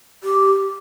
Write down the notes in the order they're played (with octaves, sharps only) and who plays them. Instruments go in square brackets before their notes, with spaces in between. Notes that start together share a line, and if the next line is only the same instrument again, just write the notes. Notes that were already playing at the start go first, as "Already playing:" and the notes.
[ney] G4